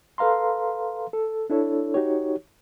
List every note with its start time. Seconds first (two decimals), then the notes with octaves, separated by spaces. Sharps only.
0.18 A4 B4 F5 A#5 C6
1.13 A4
1.50 D4 E4 A4 C#5
1.94 D#4 F#4 G4 C#5